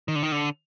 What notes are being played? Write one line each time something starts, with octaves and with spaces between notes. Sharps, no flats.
D#3
D3
D#3
D3